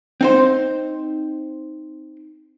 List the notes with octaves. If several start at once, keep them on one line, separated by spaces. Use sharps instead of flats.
C4 D#4 C5